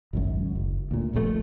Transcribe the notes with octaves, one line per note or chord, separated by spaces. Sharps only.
G#1 C#2 F#2
F#1
D2 A#2
D#1 A#1 G#2 A3